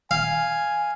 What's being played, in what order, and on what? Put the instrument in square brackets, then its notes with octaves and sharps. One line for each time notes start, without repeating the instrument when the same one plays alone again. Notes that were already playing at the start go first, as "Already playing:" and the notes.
[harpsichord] F5 [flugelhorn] G#5